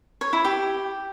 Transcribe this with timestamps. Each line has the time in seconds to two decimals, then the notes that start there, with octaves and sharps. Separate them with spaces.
0.21 C#5
0.33 E4
0.45 G4